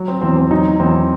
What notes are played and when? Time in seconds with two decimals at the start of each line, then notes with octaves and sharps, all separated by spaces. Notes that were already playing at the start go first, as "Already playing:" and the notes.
Already playing: F#3
0.08 C4
0.22 E2 C4
0.37 C4
0.51 F#3 D#4
0.79 E2 C4